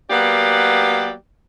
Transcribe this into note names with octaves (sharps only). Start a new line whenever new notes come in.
F#3 A#3 B3 G4 D5